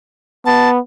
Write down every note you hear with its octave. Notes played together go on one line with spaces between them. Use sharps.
B3 A5